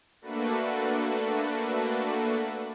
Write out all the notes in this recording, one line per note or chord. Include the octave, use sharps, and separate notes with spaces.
A3 A#3 D4 F#4 A4 B4